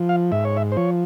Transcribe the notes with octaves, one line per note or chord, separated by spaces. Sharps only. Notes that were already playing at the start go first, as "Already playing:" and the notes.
Already playing: F3
F5
G#2 E5
C#5
E5
C5
F3 C#5